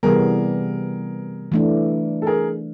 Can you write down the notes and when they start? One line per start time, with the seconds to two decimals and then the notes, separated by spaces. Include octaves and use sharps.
0.03 C3 E3 G3 B3 G#4 A#4
1.52 E3 A3 D4
2.22 A4
2.27 G#4 A#4